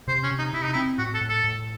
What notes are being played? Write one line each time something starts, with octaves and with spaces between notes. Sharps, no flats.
C3 C5
C#4
C3
D#4
C3 E4
D#4
C4 E4
A2 F#4
A4
A2
A4
A2